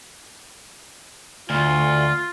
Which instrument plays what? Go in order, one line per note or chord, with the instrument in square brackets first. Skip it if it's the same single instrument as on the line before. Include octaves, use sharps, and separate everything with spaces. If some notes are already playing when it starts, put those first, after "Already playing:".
[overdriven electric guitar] D2 [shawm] F4